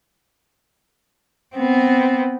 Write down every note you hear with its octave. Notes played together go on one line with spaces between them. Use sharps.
B3 C4